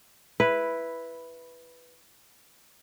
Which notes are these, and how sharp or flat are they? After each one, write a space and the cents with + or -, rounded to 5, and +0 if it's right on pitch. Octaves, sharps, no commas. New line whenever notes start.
E4 +5 B4 +0